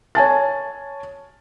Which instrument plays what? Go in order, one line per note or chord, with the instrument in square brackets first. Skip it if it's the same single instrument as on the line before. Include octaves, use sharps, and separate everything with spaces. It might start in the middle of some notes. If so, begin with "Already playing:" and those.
[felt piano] C#5 G#5 A5 A6